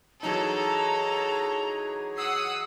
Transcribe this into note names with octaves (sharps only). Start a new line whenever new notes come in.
E3 F#3 D#4 G#4 A4 C#5 A#5
F#5 D#6 E6 C7